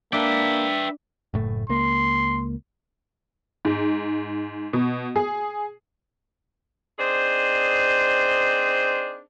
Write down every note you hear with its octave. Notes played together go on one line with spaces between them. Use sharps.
A#3 D4 B4 E5 G5
F#1 A2 A3
C#2 A#3 C6
G#2
B2
G#4
C4 D4 D#4 G#4 C5